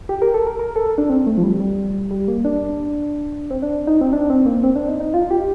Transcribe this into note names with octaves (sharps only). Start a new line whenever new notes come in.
G4
A#4
A4
A#4
A#4
A4
D4
C4
A3
F3
G3
G3
G3
A#3
D4
C4
D4
D#4
C4
D4
C4
A#3
C4
D4
D#4
D#4
F4
G4